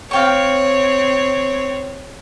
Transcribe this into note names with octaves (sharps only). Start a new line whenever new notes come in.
C4 C#5 F5 G5 C#6